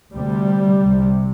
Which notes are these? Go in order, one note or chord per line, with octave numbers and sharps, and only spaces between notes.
D2 C3 G3
C2 C3